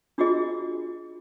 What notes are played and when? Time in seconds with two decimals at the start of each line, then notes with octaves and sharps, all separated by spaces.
0.18 D4 F4 F#4 G#4 D#5